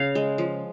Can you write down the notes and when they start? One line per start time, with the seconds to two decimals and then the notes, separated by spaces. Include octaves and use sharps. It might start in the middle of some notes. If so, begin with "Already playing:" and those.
Already playing: C#3 F5
0.15 G#3
0.38 F3